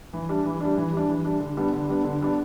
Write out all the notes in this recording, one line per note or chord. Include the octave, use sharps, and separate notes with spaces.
E3
G3 D4
E3
G3 D4
E3
G3 D4
E3
G3 D4
D3
G3 B3 D4
D3
G3 B3 D4
D3
G3 B3 D4